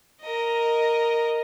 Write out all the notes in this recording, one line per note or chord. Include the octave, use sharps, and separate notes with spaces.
A#4 D#5